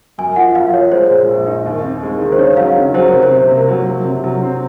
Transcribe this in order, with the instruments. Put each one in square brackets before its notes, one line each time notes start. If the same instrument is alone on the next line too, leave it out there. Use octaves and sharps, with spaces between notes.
[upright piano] F#2 [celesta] G#5
[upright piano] F3 [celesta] F#5
[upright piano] F#2 [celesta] F5
[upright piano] F3 [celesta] C#5
[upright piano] G#3 [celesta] C5
[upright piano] A#2
A#1
D#4
D#2
C4
G#3
D#3
[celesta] C5
[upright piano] C#3 [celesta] C#5
[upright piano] F#3 [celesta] F5
[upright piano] C#3
[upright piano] F#3 [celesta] C5
[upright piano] C3 [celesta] A#4
[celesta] C5
[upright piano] C3
A#3
F#3
F#3
C3
F#3
C4